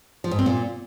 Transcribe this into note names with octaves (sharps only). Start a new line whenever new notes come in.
F3
G#2
C4
A#2